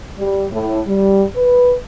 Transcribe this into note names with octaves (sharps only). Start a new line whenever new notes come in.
G3
A2
G3
B4